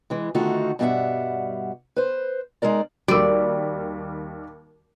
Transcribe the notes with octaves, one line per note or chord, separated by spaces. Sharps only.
E3 G#3
D3 D#3 A3 D#4 F4 F#4
G2 B2 G3 G4 E5 F#5
B4 C5
G#3 D#4 A#4 D5
D#2 G3 F#4 A#4 D5